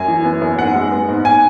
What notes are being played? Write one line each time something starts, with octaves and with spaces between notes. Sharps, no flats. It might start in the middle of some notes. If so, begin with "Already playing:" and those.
Already playing: F#2 G#5
E3
B3
F#2
G#2 F#5
G#3
B3
G#2
G#5